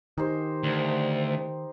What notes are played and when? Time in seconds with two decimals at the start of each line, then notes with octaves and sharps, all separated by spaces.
0.18 D#3 D#4 G4 C5
0.63 D2